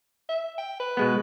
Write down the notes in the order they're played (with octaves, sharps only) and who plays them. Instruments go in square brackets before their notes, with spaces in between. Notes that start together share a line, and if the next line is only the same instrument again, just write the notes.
[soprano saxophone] E5
G5
B4
[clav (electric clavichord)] B2 G#3 B3